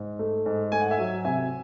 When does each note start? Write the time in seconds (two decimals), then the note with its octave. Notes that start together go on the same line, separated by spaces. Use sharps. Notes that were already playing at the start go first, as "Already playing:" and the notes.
Already playing: G#2
0.19 A3
0.46 G#2
0.72 A3 G#5
0.81 F#5
0.91 E5 G#5
0.98 F#3
1.25 C3 E5 G#5